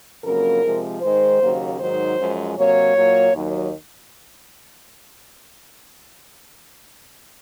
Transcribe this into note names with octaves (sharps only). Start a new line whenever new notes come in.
F2 C#3 F#3 A#3 A#4
C3 F3 G#3
G#2 D#3 G#3 C5
D#2 C#3 F#3 A#3
G#2 D#3 F#3 C5
F#2 F3 G#3
C3 F#3 A#3 C#5
A#2 F#3 A#3
D#2 D#3 F#3